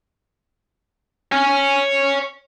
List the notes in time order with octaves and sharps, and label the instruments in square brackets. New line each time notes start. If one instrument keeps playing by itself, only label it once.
[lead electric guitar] C#5 G#5